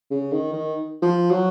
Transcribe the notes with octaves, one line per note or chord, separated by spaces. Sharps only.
C#3
D#3
D#3
F3
F#3